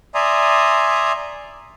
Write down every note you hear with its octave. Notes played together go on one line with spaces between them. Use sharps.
D5 E5 G#5 A#5 C6 D#6